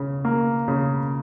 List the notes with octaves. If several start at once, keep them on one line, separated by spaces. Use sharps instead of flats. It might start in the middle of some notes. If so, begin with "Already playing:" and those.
Already playing: C#3
A#3
C#3